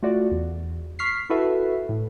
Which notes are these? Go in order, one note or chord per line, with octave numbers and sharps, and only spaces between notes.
A3 F4 F#4 D5
E2
C#6 F6 B6 C7
E4 F#4 A4 B4 E5
A2